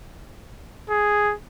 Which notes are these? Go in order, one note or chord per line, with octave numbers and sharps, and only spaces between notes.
G#4